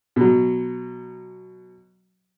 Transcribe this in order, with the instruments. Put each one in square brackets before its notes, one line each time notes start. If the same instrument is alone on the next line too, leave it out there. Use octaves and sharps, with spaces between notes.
[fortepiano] B2 F#3